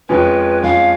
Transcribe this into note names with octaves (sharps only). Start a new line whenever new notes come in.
F2 F3 G#3 C#4 F4 B4
F2 F3 G#3 C#4 F4 F5